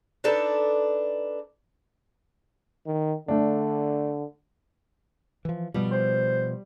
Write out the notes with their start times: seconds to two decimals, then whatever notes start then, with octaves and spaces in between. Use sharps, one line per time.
0.24 D4 D#4 A4 B4
2.86 D#3
3.28 D3 A3 D4
5.45 E3 F3
5.74 B2 F3 G3
5.92 C5